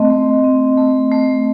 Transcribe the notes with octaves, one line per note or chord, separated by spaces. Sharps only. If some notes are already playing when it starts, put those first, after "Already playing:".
Already playing: A3 C4 D#5
A3
C4
A3
A3